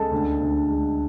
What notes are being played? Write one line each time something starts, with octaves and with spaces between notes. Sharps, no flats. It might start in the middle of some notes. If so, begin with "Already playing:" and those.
Already playing: C#2 G#3 A4 A5
D2
D2
G#3